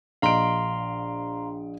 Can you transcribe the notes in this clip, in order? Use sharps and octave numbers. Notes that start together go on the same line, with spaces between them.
A#1 D#5 F5 A#5 C6 D7